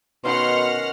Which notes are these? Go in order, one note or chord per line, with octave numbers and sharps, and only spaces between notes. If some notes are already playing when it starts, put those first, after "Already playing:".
B2 D#3 C#4 F#5 C6 F6 C7